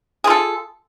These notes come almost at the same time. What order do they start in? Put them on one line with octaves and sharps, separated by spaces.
G#4 F4 A4